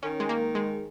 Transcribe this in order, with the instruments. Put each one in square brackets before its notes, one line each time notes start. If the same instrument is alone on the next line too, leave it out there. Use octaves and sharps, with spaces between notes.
[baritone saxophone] D#3 [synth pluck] C#4
[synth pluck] G#3
A#3
G#3